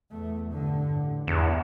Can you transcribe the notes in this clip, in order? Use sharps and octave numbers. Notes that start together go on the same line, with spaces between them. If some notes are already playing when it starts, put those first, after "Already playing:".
E2 A3
G2 D3
A1
E2 G2 E3